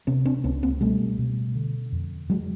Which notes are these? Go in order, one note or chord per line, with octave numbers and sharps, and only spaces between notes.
C3 B3 C#4
C4 D4
C#2 B3 C#4
A#3 C4
B2 G3 A3
B2
D3
F2
F2 F#3 G#3